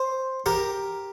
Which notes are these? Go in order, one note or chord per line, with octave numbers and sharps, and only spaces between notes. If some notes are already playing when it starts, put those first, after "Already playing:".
Already playing: C5
G4 A#4